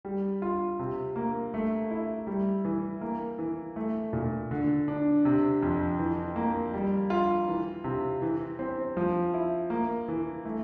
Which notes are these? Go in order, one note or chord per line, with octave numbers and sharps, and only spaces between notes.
G3
F4
C3
A#3
A3
E4
G3
E3
A#3
E3
A3
A#2
D3
D4
C3
F2
E3
A#3
G3
F4
E3
C3
E3
C4
F3
E4
A#3
E3
A3